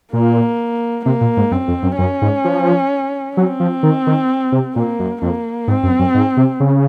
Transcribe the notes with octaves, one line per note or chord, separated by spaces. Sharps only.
A#2 A#3
C3 A#3
A#2
G#2
F#2 C4
F2
F#2
F#2 C#4
G#2
F3
F#3 C4
F3
D#3
D#3
C3
A#2 A#3
F#2
F2 A#3
G#2 C4
F#2
F#2
G#2
C3
C#3